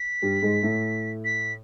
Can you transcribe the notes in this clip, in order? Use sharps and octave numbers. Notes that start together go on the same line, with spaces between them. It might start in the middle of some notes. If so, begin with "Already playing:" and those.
Already playing: B6
G2 G3
G#2 G#3
A2 A3
B6